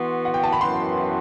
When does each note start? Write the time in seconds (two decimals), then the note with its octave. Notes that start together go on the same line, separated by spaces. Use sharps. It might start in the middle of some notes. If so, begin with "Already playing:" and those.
Already playing: E3 B3 F#4 C6
0.25 F#5
0.34 G5
0.44 A5
0.52 B5
0.61 F#2 E3 B3 F#4 C6